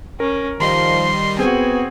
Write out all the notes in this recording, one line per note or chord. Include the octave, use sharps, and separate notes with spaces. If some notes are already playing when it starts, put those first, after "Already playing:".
C#4 A#4
D#3 F3 G3 D#4 C6
B3 C4 F#4 G#4 G#5